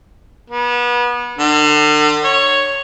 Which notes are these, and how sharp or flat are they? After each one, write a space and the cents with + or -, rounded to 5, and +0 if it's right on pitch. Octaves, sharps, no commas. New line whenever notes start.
B3 -30
D3 +40
C#5 +0